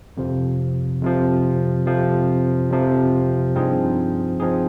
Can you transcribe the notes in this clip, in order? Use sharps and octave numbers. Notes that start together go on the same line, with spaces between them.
F2 C3 F3
F2 C3 F3
F2 C3 F3
F2 C3 F3
G2 F3 C4 D#4 G#4
F3 C4 D#4 G#4